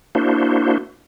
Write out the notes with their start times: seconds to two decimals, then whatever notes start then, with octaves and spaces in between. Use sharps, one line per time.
0.15 A#3 D4 E4 F#4 C5